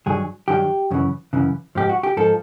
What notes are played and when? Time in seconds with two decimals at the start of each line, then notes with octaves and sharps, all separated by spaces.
0.06 G2 D#3 F#3 G#4
0.48 G2 D#3 F#3 G4
0.91 F#2 C#3 E3
1.33 F#2 C#3 E3
1.75 G#2 F3 G4
1.89 F#4
2.03 G4
2.17 G#2 F3 A4